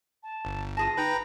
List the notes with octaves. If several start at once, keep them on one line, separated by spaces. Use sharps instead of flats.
A5
G1
F4 G#4 A5 A#6
D#4 B4 G5 A#5